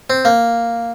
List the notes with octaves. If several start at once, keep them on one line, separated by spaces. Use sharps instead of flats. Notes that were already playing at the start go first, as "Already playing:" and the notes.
C4
A#3